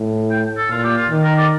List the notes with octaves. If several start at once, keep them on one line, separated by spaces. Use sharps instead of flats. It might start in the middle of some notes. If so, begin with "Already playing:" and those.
Already playing: A2
G5
A4
A#2 F4
G4
F4
D#3
A#4
D5